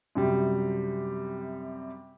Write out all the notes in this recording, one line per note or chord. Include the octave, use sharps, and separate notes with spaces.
F#2 C3 G3